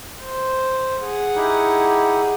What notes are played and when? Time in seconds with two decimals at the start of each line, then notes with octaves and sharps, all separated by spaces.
0.20 C5
1.01 G#4 F#5
1.36 D#4 E4 G4